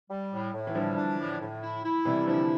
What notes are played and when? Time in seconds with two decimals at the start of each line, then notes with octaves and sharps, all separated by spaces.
0.10 G3
0.32 A2
0.54 A2
0.67 E3
0.75 D3 F3 G3
0.96 D4
1.19 A2
1.40 A2
1.62 E4
1.84 E4
2.05 C3 E3 G3
2.27 D3 F3 E4